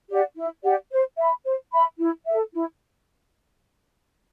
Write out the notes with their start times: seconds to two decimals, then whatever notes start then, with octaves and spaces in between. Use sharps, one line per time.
0.09 G4 D5 F#5
0.37 E4
0.64 G4 D5 F#5
0.91 C5
1.17 E5 B5
1.44 C5
1.73 E5 B5
1.99 E4
2.26 A4 E5
2.53 E4